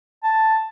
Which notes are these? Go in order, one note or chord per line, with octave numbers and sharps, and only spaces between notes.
A5